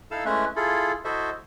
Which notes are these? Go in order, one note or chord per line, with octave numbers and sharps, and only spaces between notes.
D#4 E4 A4 F5 E6
G#3 A3 C#4 E4 B4 E5
E4 F4 G#4 A4
E4 F#4 A4 C5 D#5 E5